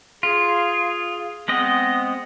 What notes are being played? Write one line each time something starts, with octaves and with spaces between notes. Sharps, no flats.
F4 G#4
G#3 B3 C4 D#5